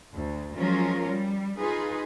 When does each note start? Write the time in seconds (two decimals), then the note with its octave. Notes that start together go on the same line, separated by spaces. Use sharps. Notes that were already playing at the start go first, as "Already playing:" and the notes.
0.13 D2
0.57 F3 F#3 G#3 C#4 F4 A#4
1.08 G3
1.58 D#4 F4 G#4 B4